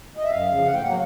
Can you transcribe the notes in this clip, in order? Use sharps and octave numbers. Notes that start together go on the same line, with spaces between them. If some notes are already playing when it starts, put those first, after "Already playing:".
D#5
E5
F#2 F5
C#3 F3
A2 F#5
G5
F#3 A#3 F#5